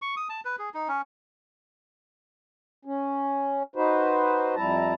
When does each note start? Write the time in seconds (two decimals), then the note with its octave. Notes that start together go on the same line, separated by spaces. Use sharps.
0.02 C#6
0.17 D#6
0.29 A5
0.45 B4
0.59 G#4
0.74 D#4
0.88 C#4
2.85 C#4
3.76 D#4 F#4 B4 C5
4.56 F2 G3 E4 A5 A#5